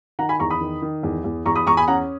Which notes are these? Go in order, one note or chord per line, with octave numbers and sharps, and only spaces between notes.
D#3 F#5 A#5
G#5 B5
E2 A#5 C#6
B5 D#6
D#3
D#3
E2
E2
E2 A#5 C#6
B5 D#6
E2 A#5 C#6
G#5 B5
C#4 F#5 A#5